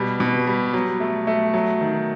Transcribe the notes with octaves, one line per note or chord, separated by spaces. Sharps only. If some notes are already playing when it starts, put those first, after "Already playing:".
Already playing: B2 G3
B2
G3
F#3
A3
A3
F#3
D#3